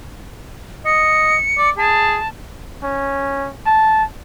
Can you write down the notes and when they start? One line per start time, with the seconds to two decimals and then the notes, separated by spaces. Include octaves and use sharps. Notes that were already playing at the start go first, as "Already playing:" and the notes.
0.85 D#5 C#7
1.58 D5
1.77 G#4 A5
2.83 C#4
3.66 A5